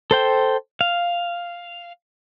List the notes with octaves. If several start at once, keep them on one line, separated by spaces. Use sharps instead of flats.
A4 C5 G5
F5